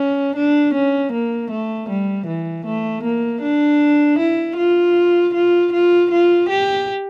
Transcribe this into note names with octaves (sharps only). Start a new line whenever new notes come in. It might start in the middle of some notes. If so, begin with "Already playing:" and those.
Already playing: C#4
D4
C#4
A#3
A3
G3
E3
A3
A#3
D4
E4
F4
F4
F4
F4
G4